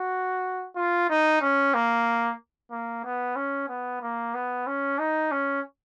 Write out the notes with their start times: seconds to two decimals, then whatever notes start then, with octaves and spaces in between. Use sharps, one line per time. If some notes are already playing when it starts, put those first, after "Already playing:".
Already playing: F#4
0.76 F4
1.09 D#4
1.41 C#4
1.74 A#3
2.71 A#3
3.04 B3
3.36 C#4
3.69 B3
4.02 A#3
4.34 B3
4.67 C#4
4.99 D#4
5.31 C#4